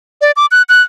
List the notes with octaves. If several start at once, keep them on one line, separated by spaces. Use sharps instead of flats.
D5
D6
F#6
F#6